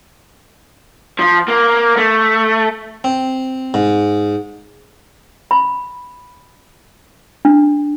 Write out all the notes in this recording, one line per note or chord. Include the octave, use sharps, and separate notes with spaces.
F3
A#3
A3
C4
G#2
B5
D4